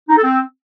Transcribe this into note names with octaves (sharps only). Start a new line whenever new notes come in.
D#4
A4
C4